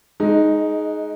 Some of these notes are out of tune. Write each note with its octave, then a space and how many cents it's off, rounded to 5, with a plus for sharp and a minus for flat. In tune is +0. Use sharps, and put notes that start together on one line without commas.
G#3 +20 D#4 +0